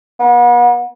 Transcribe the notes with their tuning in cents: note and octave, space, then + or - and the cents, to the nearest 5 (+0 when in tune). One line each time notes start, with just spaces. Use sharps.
B3 -40